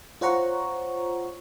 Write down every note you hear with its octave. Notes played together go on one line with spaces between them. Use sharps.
F4 C5 C#5 F#5 A#5 C#6